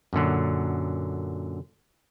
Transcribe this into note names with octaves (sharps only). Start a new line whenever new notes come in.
F#2 A#2 D3 F#3